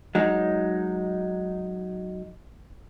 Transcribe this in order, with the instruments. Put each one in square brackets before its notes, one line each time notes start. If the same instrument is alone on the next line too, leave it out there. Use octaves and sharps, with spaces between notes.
[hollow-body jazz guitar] F#3 G#3 D#4